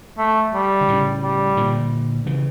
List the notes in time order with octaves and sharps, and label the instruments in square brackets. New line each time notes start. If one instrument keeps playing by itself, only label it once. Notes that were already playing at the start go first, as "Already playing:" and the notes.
[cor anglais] A3
G3
[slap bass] D3
A2 C#3
[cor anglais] G3
[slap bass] A#2 D3
C#3 E3